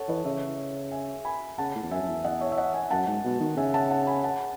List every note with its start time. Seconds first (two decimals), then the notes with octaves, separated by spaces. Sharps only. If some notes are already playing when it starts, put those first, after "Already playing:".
Already playing: A4 C#5 F#5 A5
0.08 E3 B4 D#5
0.25 C#3 C#5 E5
0.92 E5 G#5
1.25 G#5 B5
1.58 C#3 F#5 A5
1.75 A2
1.83 E2
1.91 F#2 E5 G#5
2.02 F#2
2.09 E2
2.24 D#5 F#5
2.41 C#5 E5
2.52 E5
2.58 D#5 F#5
2.74 E5 G#5
2.91 F#2 F#5 A5
3.07 G#2
3.25 B2
3.40 D#3
3.57 C#3 E5 G#5
3.74 F#5 A5
3.91 F#5 A5
4.07 G#5 B5
4.24 F#5 A5